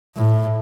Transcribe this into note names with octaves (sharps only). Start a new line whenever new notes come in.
A2